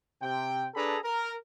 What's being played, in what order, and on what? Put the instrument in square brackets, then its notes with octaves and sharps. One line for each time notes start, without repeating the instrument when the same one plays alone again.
[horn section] C3 G5
D4 G#4 A4 B4 A#5 B5
A#4